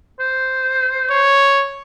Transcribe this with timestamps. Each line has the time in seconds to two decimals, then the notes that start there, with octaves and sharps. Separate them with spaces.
0.20 C5
1.11 C#5